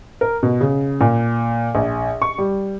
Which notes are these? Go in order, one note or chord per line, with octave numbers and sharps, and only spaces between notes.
A#4
B2
C#3
A#2
A#1
C#6
G3